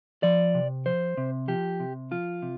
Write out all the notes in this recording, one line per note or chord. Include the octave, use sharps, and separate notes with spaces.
F3 D5
C3
F3 C5
C3
F3 G4
C3
F3 F4
C3